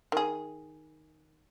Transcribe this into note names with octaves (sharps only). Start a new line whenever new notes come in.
D#3 G#4